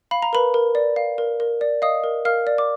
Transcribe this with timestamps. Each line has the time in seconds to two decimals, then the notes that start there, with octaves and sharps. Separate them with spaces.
0.11 F5 B5
0.22 A#5
0.33 A#4 B4 B5
0.54 A#4
0.75 D5
0.96 F5
1.18 A#4
1.40 A#4
1.61 D5
1.82 D#5 F5 D#6
2.04 A#4
2.25 A#4 F5 F6
2.47 D5
2.58 D6